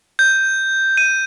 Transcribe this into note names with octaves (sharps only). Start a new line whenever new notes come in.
G6
D#7